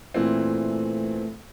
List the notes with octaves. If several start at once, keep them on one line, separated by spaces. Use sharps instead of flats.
A#2 E3 A3 C4